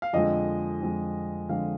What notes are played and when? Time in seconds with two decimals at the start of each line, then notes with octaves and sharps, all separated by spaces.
0.02 F5
0.13 F2 D3 F3 G#3 D#5
0.81 F2 D3 F3 G#3
1.49 F2 D3 F3 G#3 F5